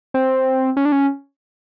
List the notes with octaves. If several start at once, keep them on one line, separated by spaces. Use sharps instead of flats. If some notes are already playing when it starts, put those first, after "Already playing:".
C4
C#4
D4
C#4